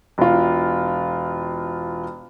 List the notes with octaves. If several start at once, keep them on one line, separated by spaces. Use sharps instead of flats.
E1 F4